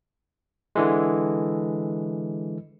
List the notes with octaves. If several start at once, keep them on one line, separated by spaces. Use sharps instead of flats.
D3 E3 G#3